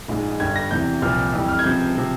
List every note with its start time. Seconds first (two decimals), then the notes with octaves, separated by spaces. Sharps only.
0.08 A#1 G#2 F3 G#3
0.40 G1 G2 G3 G#6
0.56 A#6
0.71 E2 C3 E3 G6
1.02 C2 A#2 F3 F6
1.33 F2 E3 G3
1.48 F6
1.59 G#6
1.64 C#2 C3 F3 G6
1.97 C3 F3